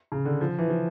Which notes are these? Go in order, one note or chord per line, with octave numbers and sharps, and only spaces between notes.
C#3
D3
F3
E3
F3